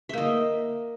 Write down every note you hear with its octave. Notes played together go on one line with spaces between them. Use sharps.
A#3 D#5 E5